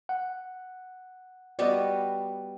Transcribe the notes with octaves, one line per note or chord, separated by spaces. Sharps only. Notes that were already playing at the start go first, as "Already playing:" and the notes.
F#5
G3 B3 F#4 D5 D#5